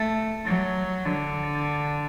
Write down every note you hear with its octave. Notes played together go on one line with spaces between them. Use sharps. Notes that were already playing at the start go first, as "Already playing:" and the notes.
Already playing: A3
F#3
D3